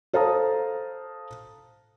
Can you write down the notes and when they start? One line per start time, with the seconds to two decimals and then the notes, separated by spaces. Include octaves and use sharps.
0.13 A4 C5 F5 A5 A#5 D#6